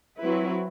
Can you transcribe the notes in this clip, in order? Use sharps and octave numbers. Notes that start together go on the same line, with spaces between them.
F#3 C4 E4 B4